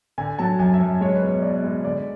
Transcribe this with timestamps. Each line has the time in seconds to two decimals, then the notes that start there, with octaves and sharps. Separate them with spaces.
0.18 D3 G#5
0.39 F#3 A5
0.59 F#2 G#5
0.74 E5
0.80 F#2
1.01 G#3 C#5
1.16 B4
1.22 B2
1.29 C#5
1.42 B2 D5
1.64 G#3
1.84 D3 D5